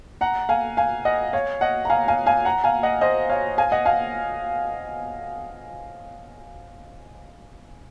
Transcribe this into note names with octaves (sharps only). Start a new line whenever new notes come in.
F#5 A#5
F5 G#5
F5 G#5
D#5 F#5
C#5 F5
D#5 F#5
A#5
F5 G#5
F5 G#5
F5 G#5
F#5 A#5
F5 G#5
D#5 F#5
C5 D#5
C#5 F5
F5 G#5
D#5 F#5
F5 G#5